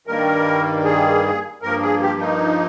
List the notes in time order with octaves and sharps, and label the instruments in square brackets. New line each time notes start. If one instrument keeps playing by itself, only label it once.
[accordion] G2 D#3 G3 A#3 A#4
G#4
G2 F3 A#3 A#4
G#4
G4
D#4